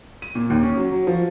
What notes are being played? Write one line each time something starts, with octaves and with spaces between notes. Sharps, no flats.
D#7
A#2
D#2
C#4
F#3
F#3
F3